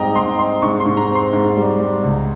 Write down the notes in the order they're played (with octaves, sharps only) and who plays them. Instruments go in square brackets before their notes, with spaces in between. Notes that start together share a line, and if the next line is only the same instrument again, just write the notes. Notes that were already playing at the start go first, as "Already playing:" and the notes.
Already playing: [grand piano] G#2 G3 C4 [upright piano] D#5 G5 A#5
[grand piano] G#2 [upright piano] C6
[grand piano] C4 [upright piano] C6
[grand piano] G#2 [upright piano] C#6
[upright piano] C6
[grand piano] G#2
[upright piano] A#5
[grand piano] C4
[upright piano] C6
[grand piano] G#2
G3
G3
C#2